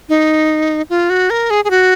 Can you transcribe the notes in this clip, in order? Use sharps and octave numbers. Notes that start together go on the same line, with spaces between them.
D#4
F4
F#4
A#4
G#4
G#4
F#4